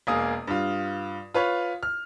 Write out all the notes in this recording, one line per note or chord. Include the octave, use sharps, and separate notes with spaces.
E1 A#3 G#4 F5 D#6
G2 F4
F4 B4 C#5
F6